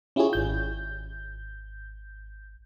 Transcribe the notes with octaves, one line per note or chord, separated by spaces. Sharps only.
C#4 E4 F4 G4 G#4 C#5
G#1 G6